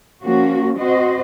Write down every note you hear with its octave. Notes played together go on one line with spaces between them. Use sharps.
F3 A#3 C#4 F#4
C4 F#4 C5 D#5